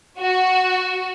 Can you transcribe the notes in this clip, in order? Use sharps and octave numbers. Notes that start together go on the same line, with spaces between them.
F#4